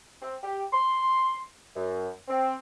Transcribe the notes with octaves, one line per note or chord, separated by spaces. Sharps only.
C4
G4
C6
F#2
C4